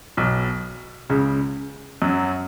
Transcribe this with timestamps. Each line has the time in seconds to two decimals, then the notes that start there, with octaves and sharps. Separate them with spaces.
0.17 B1 B2
1.10 C#2 C#3
2.02 F#2 F#3